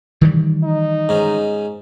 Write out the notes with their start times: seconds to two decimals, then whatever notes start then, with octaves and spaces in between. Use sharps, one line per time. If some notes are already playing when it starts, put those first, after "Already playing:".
0.21 D#3 E3 G3
0.64 D#4
1.09 G#2 C#4